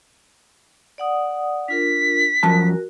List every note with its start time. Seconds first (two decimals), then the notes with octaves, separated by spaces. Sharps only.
0.98 D5 F#5 D#6
1.68 D4 F4 A#4 B6
2.43 F#2 F3 F#4 A#4 A5